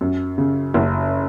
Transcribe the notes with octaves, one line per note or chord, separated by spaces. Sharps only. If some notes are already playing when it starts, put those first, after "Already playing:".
F#2
C#3
F#1